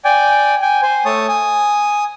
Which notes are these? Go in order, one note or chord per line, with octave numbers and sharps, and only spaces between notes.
D5 G5 G#5
G5 G#5
C5 G#5
A3 C#5 A5 D#6
G#5 D#6